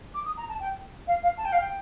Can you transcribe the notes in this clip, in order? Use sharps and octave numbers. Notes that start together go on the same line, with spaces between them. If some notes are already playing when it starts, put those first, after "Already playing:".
D6
D#6
A#5
A5
G5
F5
F5
A5
G5
F5
G5